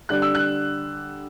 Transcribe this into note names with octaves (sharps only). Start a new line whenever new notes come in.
D3 G3 D4 F#6
E6
F#6